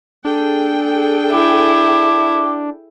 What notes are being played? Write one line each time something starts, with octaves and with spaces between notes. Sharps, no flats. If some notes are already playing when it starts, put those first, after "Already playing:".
D4 G#4 A4 G5
E4 D6